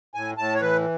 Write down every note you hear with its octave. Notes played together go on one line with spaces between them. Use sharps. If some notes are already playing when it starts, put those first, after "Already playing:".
A2 G#5
A2 A5
C#5
E3 B4